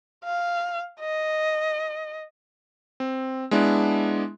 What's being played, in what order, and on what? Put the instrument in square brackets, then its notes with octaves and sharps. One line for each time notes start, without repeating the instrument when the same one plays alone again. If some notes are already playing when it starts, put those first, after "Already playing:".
[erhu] F5
D#5
[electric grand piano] C4
G#3 B3 D4 E4